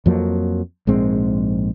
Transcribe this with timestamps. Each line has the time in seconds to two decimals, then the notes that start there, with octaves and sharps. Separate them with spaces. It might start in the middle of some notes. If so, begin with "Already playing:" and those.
0.06 F2 F3 F#3 A#3
0.87 A#1 G#2 G#3 C4